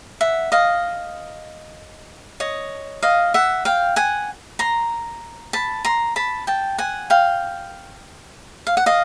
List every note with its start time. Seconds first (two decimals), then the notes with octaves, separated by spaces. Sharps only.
0.21 E5 F#5
0.52 D#5 F5
2.40 C#5 D#5
3.02 D#5 F5
3.34 E5 F#5
3.65 F5 G5
3.96 F#5 G#5
4.59 A#5 C6
5.53 A5 B5
5.85 A#5 C6
6.16 A5 B5
6.47 G5 A5
6.78 F#5 G#5
7.10 F5 G5
8.67 F5
8.77 F#5
8.86 D#5 F5